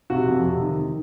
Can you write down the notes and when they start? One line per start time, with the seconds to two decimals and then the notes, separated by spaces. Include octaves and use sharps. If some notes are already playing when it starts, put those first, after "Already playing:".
0.10 C3 F#4
0.27 F2
0.44 C3
0.61 D#3
0.79 D#3